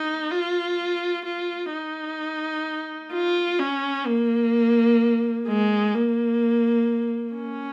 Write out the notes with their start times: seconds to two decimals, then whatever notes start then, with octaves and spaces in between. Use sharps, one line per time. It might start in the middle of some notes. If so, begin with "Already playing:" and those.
Already playing: D#4
0.31 F4
1.25 F4
1.72 D#4
3.13 F4
3.59 C#4
4.06 A#3
5.48 G#3
5.94 A#3
7.34 C#4